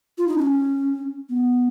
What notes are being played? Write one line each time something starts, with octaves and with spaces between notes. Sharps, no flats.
F4
D#4
C#4
B3